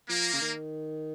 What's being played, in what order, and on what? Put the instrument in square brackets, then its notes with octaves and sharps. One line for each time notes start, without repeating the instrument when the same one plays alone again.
[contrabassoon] F3 [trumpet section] A#3
[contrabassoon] C#3
D#3